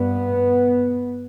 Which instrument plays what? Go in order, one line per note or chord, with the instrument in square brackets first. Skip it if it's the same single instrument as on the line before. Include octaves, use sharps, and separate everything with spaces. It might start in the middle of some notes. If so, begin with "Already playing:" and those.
Already playing: [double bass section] G2 B3